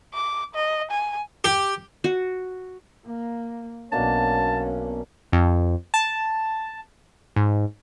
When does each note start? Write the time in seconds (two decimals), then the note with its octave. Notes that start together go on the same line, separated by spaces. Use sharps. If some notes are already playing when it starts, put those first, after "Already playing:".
0.14 D6
0.55 D#5
0.91 G#5
1.44 G4
2.04 F#4
3.06 A#3
3.92 B1 B2 A#3 C#4 D4 A5
5.32 F2
5.94 A5
7.36 G#2